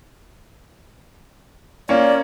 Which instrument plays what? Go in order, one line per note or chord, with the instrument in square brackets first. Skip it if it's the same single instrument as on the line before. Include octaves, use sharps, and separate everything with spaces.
[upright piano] A#3 C#4 [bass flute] D5